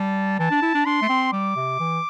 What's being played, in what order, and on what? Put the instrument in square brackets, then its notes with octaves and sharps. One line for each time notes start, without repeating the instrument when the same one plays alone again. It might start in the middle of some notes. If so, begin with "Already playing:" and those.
Already playing: [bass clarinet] G3 [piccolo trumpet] A5
[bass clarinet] E3 [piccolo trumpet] A5
[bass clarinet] D4
E4
D4
[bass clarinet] D4 [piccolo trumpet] C6
[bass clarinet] A3
C4
[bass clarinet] G3 [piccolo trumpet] D6
[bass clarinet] C3
E3